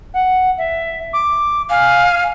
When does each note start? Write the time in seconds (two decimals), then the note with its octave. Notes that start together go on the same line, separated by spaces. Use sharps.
0.13 F#5
0.57 E5
1.13 D6
1.70 F5 G#5